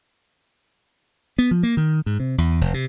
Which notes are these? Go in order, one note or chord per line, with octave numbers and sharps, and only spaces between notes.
B3
F3
A#3
D#3
G#2
C3
E2
F1
C3